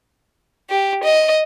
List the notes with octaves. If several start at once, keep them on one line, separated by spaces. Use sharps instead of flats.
G4
D#5